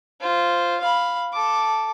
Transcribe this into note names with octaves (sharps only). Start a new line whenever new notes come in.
F4 C5
F5 B5
A4 D6